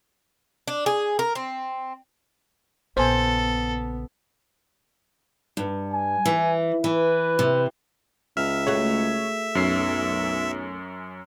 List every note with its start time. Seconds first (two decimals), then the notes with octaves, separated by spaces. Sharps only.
0.68 D4
0.86 G#4
1.19 A#4
1.35 C4
2.97 A#1 C#3 B3 A4 C5 G#5
5.57 G2
5.94 G#5
6.25 E3
6.84 E3 B4
7.39 C3
8.37 C#2 E5 F6
8.67 A3 F#4 G#4 C#5
9.55 B1 F#2 C#4 C7